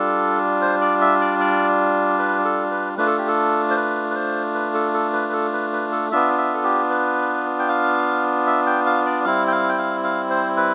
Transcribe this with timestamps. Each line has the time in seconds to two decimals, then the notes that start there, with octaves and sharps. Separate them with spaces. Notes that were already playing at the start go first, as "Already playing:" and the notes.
Already playing: G3 D4 F4 A4
0.62 C5
0.81 D5
1.01 E5
1.21 D5
1.40 D5
2.19 B4
2.45 A4
2.71 B4
2.97 A3 D4 F4 B4
3.07 A4
3.18 G4
3.28 A4
3.71 C5
3.76 B4
4.11 B4
4.15 C5
4.55 B4
4.74 A4
4.94 A4
5.13 B4
5.28 B4
5.33 A4
5.53 B4
5.73 B4
5.92 A4
6.11 B3 D4 F4 E5
6.38 E5
6.54 A4
6.64 G4
6.90 B4
7.59 G5
7.68 F5
8.47 E5
8.66 G5
8.86 F5
9.06 D5
9.25 G3 C4 E4 F5
9.48 G5
9.52 F5
9.69 G5
9.78 F5
10.04 F5
10.30 C5
10.57 B4